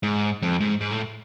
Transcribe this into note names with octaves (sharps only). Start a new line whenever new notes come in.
G#2
F2
G#2
G#2
A2